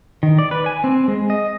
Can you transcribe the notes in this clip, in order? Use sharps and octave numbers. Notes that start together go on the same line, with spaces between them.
D#3
D5
B4
G#5
C4
G#3
D#5